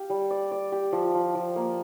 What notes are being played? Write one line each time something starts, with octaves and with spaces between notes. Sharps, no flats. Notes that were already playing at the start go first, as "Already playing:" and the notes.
Already playing: G4 F5
G3
D5
D5
G4
F3
F3
F3
A#3